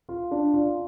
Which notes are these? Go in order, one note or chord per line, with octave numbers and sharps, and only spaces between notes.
F4
D4
F4